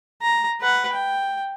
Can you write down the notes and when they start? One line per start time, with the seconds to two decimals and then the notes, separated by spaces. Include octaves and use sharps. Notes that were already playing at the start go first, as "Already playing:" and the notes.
0.22 A#5
0.60 B4 F#5
0.93 G5